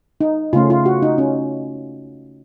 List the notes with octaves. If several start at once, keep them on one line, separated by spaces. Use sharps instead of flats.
D#4
C#3 A3 C#4 F4
F4
F#4
D#4
C#4